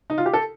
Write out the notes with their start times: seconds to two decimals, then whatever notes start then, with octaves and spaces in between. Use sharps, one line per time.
0.10 D#4
0.18 F4
0.26 G4
0.34 A4